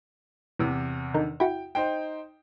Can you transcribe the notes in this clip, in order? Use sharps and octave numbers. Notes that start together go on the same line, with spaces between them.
E2 C3 E3
D3 D#3 D#4
E4 F#4 G5
D#4 C5 G5